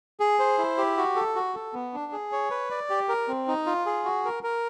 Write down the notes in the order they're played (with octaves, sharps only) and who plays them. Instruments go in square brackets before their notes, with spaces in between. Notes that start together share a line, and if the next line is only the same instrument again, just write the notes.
[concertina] G#4
C5
E4
G4
F#4
A4
F#4
A4
B3
D4
G#4
C#5
B4
D5
G4
A#4
C4
D#4
F4
G#4
F#4
A#4
A#4